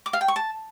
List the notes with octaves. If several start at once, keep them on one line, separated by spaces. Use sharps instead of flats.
D6
F5
G5
C#6
A5